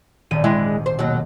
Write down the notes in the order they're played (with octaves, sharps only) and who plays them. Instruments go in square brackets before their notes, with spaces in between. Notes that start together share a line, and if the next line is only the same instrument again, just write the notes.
[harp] D#1 G#1 D#7
[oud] G#3 D4 E4
C5
D#2 B2 F#3